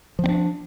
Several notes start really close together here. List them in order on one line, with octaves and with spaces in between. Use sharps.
F3 C4 D4